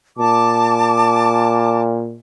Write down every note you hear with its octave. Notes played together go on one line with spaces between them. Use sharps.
A#2 A5 D6